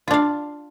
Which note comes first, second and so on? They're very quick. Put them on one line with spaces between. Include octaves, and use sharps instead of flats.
F4 D4 F5